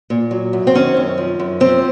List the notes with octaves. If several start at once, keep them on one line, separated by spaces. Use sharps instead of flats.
A#2
F#3
F#2
C4
D#3 C#4
F#2
F3
F#2
F3 C4